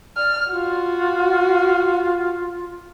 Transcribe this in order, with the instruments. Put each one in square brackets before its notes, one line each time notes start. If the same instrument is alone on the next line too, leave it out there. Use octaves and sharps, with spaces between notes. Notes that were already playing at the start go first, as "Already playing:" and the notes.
[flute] D5 [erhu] F6
[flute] F4 [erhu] F#4